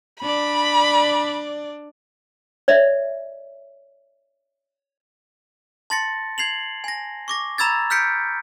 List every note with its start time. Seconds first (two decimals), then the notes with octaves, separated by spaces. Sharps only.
0.22 D4 D5 B5
2.68 C#5 D5 E5
5.90 A5 C6 A6 A#6 C#7
6.38 G#6 C7 F7 F#7
6.84 G#5 A#6
7.28 C#6 D6 A#6
7.58 A#5 B5 E6 G#6 A6
7.90 F6 G6 B6 C#7 D7